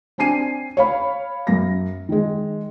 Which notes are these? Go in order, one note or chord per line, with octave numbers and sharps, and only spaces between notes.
C4 D4 G#5 C7 D#7
C#5 F5 B5
F#2 A#6
D#3 G#3